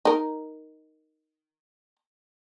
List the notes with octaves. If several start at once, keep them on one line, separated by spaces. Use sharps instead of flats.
D#4 A#4